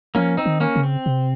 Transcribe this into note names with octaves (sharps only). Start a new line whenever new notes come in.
F3 A#3 C#4
C4 D#4
D#3
A#3 C#4
C#3
C4
C3